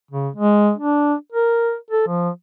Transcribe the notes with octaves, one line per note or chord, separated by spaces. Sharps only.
C#3
G#3
D4
A#4
A4
F3